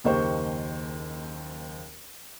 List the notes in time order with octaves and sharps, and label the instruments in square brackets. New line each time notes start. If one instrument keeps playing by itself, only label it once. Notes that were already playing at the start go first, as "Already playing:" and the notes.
[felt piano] F#1 D#2 D#3 G4 C5 C#6